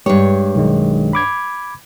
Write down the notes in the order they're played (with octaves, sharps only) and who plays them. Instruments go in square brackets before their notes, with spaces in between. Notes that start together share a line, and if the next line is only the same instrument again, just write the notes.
[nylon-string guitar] G2 C#5 [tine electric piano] G#3 G4 B4
[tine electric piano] B1 D#3 G#3
B5 D6 G#6